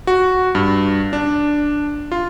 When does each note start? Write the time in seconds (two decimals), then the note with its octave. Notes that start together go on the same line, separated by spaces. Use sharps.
0.07 F#4
0.55 G2
1.13 D4
2.12 F4